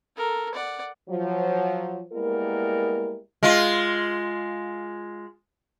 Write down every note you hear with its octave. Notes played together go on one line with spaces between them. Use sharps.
A4 A#4
D5 F#5
F3 F#3
G3 G#3 A#3 B3 E4 A#4
G#3 F4